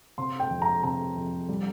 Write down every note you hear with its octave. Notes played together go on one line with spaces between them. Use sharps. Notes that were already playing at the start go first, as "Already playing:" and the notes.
C3 C6
G5
F2
A#5
C3 A#5
F2
G3